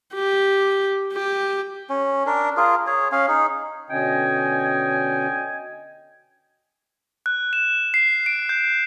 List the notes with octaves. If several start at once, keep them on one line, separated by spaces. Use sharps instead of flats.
G4
G4
C#4
D4 A#4
F4 G#4 A#4
G#4 C#5
C#4 F5
D#4 G#4
B2 D3 C#4 D#5 G5 G#5
F#6
E7
C7
D7
G6